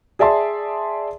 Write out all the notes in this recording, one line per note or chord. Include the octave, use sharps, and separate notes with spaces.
G#4 D5 E5 A5 C6